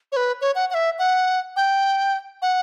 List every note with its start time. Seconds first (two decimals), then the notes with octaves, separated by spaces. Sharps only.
0.12 C#5
0.17 B4
0.41 C#5
0.55 F#5
0.70 F#5
0.74 E5
0.99 F#5
1.56 G5
2.42 F#5